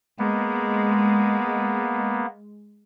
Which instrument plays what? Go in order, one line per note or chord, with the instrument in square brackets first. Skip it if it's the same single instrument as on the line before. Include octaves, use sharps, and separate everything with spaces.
[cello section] G#3 [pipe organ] A#3 B3